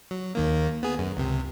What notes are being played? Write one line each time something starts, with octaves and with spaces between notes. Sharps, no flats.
F#3
D#2 D#3 A#3
B3 G#4
F#2
C#2 C3